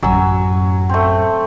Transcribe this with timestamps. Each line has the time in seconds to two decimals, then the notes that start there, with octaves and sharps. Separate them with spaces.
0.03 A1 F#2 F#3 G#5 E6
0.89 A3 C4